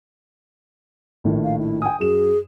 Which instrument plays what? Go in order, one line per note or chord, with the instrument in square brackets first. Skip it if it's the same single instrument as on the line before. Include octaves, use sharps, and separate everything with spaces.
[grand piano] A#1 A2 D#3
[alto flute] F5
E4
[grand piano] G5 D#6 [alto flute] G#5
[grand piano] F#2 E7 [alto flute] G#4